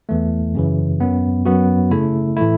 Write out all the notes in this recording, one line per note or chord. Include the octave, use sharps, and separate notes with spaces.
E2 E3 A3
F#2 C#3 E3
F#2 F#3 B3
F#2 F#3 B3 F#4
C#3 A3 E4
A2 E3 A3 E4